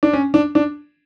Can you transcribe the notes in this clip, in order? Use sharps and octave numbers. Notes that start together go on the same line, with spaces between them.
D4
C#4
D4
D4